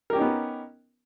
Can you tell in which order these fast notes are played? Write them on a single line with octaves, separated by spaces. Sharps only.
A#4 G4 C#4 D#4 B3